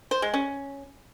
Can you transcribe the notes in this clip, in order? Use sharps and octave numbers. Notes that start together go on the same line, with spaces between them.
C5
G#3
C#4